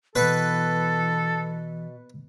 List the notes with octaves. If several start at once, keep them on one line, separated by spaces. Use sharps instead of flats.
B2 E3 A4 B4